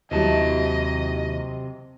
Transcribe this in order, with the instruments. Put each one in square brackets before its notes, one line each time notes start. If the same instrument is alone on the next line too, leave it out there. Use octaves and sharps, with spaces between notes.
[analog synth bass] D#2 [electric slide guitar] C3 A5 [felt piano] F#3 E4 G4 [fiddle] D#5